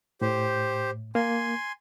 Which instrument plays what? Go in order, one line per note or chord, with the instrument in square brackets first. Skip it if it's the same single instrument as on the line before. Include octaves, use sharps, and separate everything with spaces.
[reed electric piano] A2 [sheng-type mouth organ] G4 C5
[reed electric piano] A#3 [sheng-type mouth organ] G#5 C6